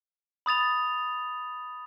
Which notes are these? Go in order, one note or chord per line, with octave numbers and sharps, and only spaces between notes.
B5 D#6 A6 F7